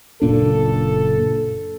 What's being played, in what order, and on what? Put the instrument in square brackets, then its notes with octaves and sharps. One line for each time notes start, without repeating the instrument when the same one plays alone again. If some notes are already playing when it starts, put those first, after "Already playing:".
[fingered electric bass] F#1 A#2 D4 [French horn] A4